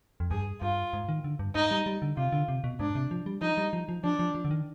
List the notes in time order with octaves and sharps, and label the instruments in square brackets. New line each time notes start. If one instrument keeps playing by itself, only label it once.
[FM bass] F2
[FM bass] G2 [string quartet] G#4
[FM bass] G2 [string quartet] F4
[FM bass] G#2
D#3
D3
G2
[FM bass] G#2 [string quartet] D#4
[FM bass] G3
G3
D3
[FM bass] C3 [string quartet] F4
[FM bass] D3
C3
B2
[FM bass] G#2 [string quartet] D4
[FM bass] C3
F3
G3
[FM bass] F3 [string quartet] D#4
[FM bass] G3
F3
F3
[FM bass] F3 [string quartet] D4
[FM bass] F3
F3
D3
D#3